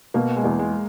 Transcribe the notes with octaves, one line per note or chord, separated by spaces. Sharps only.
B2 A#3
G#3
E2
G#3